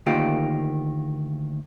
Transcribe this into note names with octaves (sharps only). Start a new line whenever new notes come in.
D2 D#3 A#3 F4 G4